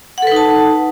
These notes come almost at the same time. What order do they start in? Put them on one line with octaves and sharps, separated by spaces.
F#5 A4 B4 D#4 A5